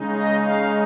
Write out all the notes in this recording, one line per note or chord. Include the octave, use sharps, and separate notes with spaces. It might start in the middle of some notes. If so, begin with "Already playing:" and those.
Already playing: C#3 G#3 D#4
D#5
F5